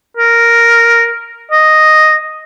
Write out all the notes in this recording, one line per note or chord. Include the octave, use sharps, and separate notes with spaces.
A#4
D#5